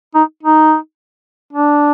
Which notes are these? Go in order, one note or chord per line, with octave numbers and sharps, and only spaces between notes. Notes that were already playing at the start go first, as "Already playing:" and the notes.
D#4
D#4
D4